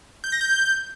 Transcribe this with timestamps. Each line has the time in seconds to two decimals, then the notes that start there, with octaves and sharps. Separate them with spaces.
0.24 G6
0.32 A#6
0.41 G6